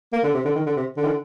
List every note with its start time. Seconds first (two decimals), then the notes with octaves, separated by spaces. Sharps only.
0.13 A#3
0.23 D3
0.34 C3
0.45 D3
0.55 D#3
0.66 D3
0.77 C3
0.97 D3
1.04 D#3
1.07 D3